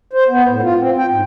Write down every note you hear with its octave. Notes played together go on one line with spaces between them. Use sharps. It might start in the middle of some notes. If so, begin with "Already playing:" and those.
C5
B3
A2
F4
C4
G5
G#2